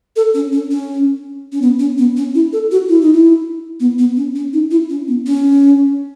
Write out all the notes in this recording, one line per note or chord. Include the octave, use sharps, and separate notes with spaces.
A4
C#4
C#4
C#4
C#4
B3
C#4
B3
C#4
E4
A4
F#4
E4
D#4
E4
B3
B3
C#4
C#4
D#4
E4
C#4
B3
C#4